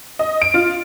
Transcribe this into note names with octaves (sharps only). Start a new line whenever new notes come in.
D#5
D7
F4